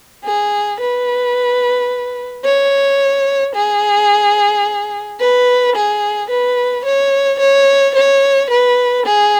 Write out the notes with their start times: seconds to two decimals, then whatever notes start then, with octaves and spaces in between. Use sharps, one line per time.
0.25 G#4
0.80 B4
2.45 C#5
3.55 G#4
5.20 B4
5.75 G#4
6.30 B4
6.85 C#5
7.40 C#5
7.95 C#5
8.50 B4
9.06 G#4